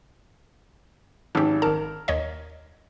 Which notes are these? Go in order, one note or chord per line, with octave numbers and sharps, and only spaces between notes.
G#1 C#4 G4
G#1 A#4 A5
D#2 C#5 D#5